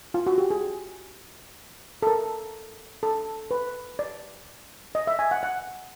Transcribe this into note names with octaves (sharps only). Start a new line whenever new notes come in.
F4
F#4
G4
G#4
A4
A#4
A4
B4
D5
D#5
E5
G#5
F#5
F#5